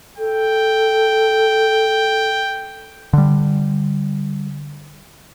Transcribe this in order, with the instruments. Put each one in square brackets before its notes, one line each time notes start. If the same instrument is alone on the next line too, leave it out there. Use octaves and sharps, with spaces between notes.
[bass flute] A4 [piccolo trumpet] G5
[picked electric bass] D3 G3